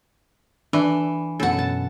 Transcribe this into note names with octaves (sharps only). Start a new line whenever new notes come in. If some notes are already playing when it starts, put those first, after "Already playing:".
E3 D4
F#2 B2 C#4 A4 F#5
A5